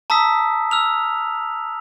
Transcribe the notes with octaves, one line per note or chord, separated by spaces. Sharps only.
A5 A#5 D#6 E6 B6
E6 F6 F7